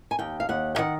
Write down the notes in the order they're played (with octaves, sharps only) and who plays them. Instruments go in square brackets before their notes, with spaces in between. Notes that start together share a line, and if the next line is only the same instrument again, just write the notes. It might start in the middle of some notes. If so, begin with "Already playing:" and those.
[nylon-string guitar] G#5
D#2 G5
F5
D#2 F#5
G5
D#3 F#5